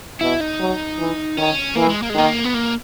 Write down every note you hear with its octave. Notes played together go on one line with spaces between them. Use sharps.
B2 E4
D#4
F#3
E3
D#3 C#4
E3 A#3
G#3
A#3
G#3
D#3 A#3
B3
A#3